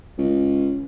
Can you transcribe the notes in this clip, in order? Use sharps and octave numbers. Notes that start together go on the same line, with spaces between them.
C#2